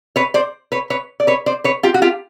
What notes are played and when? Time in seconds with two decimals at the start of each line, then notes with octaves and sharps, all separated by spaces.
0.16 B4 C#5
0.34 C5 D5
0.72 B4 C#5
0.90 B4 C#5
1.20 D5
1.27 B4 C#5
1.46 C5 D5
1.64 B4 C#5
1.83 F4 G4
1.94 F#4
2.02 F4 G4